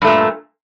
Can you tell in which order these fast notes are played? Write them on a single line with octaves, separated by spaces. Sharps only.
G2 A3 A#2